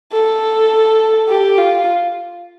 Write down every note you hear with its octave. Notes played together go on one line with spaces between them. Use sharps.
A4
G4
F4